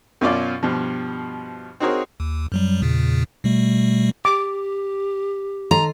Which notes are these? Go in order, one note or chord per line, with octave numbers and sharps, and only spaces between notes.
F#2 B2 C#4 F4 D5
G2 B2 F3
C4 D#4 F#4 G#4 A#4 C#5
D#2
F#2 F#3 G3
E2 A#2 C#3
B2 G3 A3
G4 D6
D#3 A4 A#5 C6